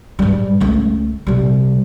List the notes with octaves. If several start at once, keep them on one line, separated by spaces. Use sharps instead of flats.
G#2 G3
C#2 A3
C3 G3